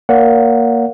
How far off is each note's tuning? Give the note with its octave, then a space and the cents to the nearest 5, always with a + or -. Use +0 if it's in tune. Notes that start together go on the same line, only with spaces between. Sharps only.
A#3 +0 C#5 +45 F#5 +0